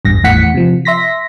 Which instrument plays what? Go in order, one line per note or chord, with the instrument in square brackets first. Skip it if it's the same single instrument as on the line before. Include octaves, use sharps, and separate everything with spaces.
[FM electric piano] A1 E2 G2 A#6
G#1 E2 A2 F#5 B6 C#7
C3 F3
E5 C6 A#6 B6